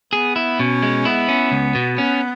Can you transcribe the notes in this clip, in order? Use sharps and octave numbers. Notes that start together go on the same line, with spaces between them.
B3 G#4
E4
B2 C#4
G#3
B3 E4
C#4
C#2
B2
B3 C#4